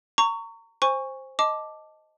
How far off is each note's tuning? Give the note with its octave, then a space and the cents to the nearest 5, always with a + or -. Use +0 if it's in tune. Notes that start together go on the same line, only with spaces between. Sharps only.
A#5 -30 C#6 +15
C5 +10 G#5 -25 C#6 +0
D#5 +0 A5 +0 D6 +0